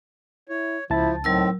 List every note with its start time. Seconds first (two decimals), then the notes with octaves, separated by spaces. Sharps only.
0.49 E4 C#5
0.90 C#2 F3 E4 A5 A6
1.24 A2 F#3 C4 D#4 A#4 E6